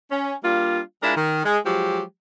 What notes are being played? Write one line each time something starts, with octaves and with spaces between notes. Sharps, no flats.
C#4
G3 A#3 D4 F4
G#3 D4 E4 F4 A#4
D#3
G#3
F3 F#3 G#3 G4